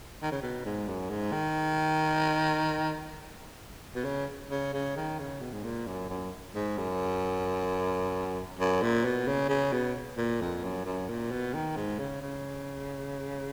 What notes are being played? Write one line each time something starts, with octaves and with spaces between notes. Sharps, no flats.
D#3
C#3
B2
G#2
F#2
G#2
D#3
B2
C#3
C#3
C#3
D#3
C#3
B2
G#2
A#2
F#2
F#2
G#2
F#2
F#2
A#2
B2
C#3
C#3
B2
A#2
F2
F#2
F#2
A#2
B2
D#3
G#2
C#3
C#3